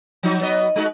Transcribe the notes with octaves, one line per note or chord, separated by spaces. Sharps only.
F3 F#3 D#4
F#3 B3 D#5
G#3 D#4 F#4